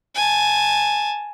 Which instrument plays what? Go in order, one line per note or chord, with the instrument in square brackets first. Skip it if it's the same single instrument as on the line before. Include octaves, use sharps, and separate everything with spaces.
[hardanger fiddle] G#5 A5